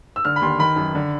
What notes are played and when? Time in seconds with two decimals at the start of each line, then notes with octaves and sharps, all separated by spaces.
0.16 E6
0.25 D3 F6
0.36 B5
0.41 D#2 C6
0.59 D#3 B5
0.76 F#2
0.95 D3